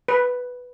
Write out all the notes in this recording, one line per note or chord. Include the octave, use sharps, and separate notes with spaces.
B4